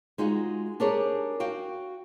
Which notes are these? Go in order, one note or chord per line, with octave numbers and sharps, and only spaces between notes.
G#3 D#4 F4 F#4
D4 G4 G#4 A#4 C#5
F#4 F5 G5